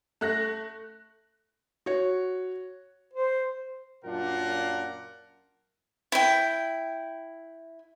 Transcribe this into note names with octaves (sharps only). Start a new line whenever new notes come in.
A3 F#6 A#6
F#4 C#5
C5
F#2 A#2 D4 F4 A#4 F#5
E4 G5